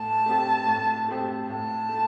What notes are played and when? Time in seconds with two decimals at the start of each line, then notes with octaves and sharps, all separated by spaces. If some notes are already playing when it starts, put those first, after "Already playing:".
Already playing: A2 A5
0.26 A3 C4 G4
0.67 A2
1.08 A3 C4 G4
1.49 A2 A5
1.89 A3